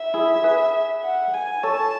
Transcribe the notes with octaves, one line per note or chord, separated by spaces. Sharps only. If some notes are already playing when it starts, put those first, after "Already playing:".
Already playing: E5
E4 G#4
G#4 B4
F#5
G#5
A4 C#5 A5